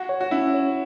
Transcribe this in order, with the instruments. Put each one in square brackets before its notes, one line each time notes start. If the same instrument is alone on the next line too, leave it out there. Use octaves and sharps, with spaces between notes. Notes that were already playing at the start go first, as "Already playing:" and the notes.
Already playing: [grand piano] F#4
[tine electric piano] C#5
[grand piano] F#4
[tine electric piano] C#4 [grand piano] E4
[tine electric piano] C#5